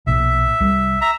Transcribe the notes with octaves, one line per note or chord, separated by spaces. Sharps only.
B1 A#2 E5
C2 G3
E5 A#5